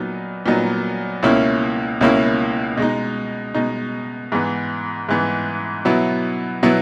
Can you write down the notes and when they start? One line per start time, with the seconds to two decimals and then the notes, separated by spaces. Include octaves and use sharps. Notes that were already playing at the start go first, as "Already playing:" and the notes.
Already playing: A#2 F#3 B3 D#4
0.46 A#2 F#3 B3 D#4
1.23 C#2 B2 A#3 C#4 E4
2.01 C#2 B2 A#3 C#4 E4
2.77 B2 G#3 D#4
3.54 B2 G#3 D#4
4.32 G#2 E3 B3
5.09 G#2 E3 B3
5.85 B2 F#3 B3 E4
6.63 B2 F#3 B3 E4